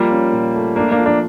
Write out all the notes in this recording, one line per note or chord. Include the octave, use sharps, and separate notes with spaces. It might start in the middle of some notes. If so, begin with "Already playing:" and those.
Already playing: F3 G3 A#3 F4
C#4
A#2
A3
A3 A#3 D4
A#3 D4
F3
A#3 D4